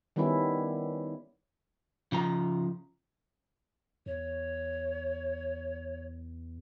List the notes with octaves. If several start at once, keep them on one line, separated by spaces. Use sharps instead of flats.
D#3 G3 B3 C#4 E4
C#3 F3 A#5
E2 C#5